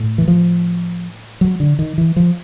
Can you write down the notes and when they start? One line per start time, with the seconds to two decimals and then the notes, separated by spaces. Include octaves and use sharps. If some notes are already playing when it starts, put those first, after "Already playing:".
Already playing: A2
0.18 E3
0.28 F3
1.41 F#3
1.60 D3
1.79 D#3
1.98 E3
2.16 F3